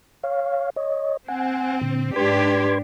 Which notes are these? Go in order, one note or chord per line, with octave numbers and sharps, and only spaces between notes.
C#5 F5
C#5 D#5
C4 F#5 G#5
A#2 D3
G#2 D4 G4 B4 C6 G#6